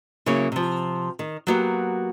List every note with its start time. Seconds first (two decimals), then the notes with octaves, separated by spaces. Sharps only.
0.26 C#3 F#3 A#3 E4 C#5
0.52 C3 F3
1.19 D#3
1.47 F#3 G3 A#3 B3 F#4 G4